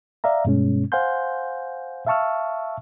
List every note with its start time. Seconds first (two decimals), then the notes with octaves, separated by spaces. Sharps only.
0.24 D5 E5 F5 A#5
0.45 G2 B2 G#3 C#4
0.92 C5 F5 F#5 G#5 C6 G6
2.07 E5 F5 A5 C#6 E6 F6